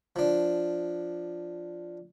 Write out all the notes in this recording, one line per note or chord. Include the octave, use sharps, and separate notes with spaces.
F3 D4